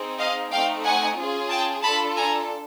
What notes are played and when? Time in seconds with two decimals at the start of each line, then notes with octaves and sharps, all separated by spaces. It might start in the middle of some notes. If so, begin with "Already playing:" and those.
Already playing: C4 D#4 G#4
0.18 D#5 F5
0.51 A3 C4 D#4 F5 G5
0.84 F#5 G#5
1.17 C#4 F4 G#4
1.50 G5 A5
1.83 D4 F4 A4 A5 B5
2.16 G#5 A#5